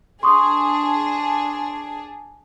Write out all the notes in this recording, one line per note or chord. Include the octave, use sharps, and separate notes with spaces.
D4 G#4 C6 C#6 D#6